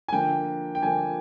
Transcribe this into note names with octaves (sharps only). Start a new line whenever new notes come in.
G#5
D3 F3 A#3 G5
G5
D3 F3 A#3 G#5